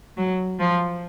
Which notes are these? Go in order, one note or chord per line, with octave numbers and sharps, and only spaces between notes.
F#3
F3